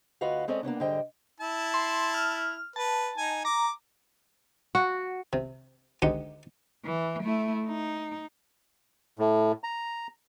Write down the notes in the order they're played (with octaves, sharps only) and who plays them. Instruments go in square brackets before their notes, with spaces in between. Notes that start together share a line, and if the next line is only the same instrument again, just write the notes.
[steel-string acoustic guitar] D2 F4 F#4 B4 D#5 F5
G#3 C4 C#4 A4 D5 D#5
A#3 B3 C#4 D4
G#2 D3 G3 C5 D#5 G5
[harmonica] E4 A5
[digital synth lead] C6
F6
[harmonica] B4 [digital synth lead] A5
[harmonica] D#4 G#5
[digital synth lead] A#5 [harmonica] D6
[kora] F#4
[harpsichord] C3
D2 G#3 D#4 G4 F#5
[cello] E3
A3 E4
D#4
[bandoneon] A2
A#5